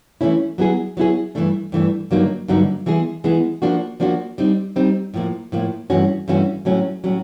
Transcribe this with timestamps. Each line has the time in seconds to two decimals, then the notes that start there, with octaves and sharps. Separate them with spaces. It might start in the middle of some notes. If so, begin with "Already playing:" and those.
0.21 E3 A3 C#4 E4
0.58 F#3 B3 E4 G#4
0.97 F#3 B3 E4 G#4
1.35 G2 E3 A3 D4
1.72 G2 E3 A3 D4
2.11 G2 D3 F#3 A#3 D#4
2.48 G2 D3 F#3 A#3 D#4
2.86 E3 G#3 B3 E4 G#4
3.24 E3 G#3 B3 E4 G#4
3.62 F3 A#3 D4 F#4
4.00 F3 A#3 D4 F#4
4.38 G3 C4 D#4
4.76 G3 C4 D#4
5.14 A2 F3 A#3
5.52 A2 F3 A#3
5.90 G2 E3 A3 C#4 F#4
6.28 G2 E3 A3 C#4 F#4
6.65 A2 F#3 A3 C#4
7.04 A2 F#3 A3 C#4